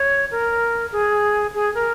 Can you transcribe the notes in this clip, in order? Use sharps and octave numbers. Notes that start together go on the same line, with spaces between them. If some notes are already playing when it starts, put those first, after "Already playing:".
Already playing: C#5
A#4
G#4
G#4
A#4